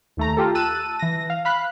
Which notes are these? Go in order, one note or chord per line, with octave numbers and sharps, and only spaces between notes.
D#2 A3 A#5
F4 G4 A4
A5 E6 F#6 D#7
E3 A#6
F5
F5 B5 F#6